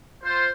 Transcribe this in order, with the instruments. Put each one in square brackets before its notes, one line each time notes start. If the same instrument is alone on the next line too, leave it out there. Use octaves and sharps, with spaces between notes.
[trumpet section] F4 C5